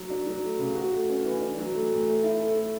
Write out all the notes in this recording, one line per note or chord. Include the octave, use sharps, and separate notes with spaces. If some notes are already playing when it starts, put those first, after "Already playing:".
Already playing: F#3
D4
F#3
A3
C#3
F#4
A3
C#4
E3
D4
F#3
A3
A2
A3
E4
A4
A3